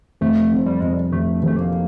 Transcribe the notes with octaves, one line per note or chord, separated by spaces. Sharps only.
F1 A3
F2
G3
F2 G#3
G3
F1 A3
F1 A3
A#3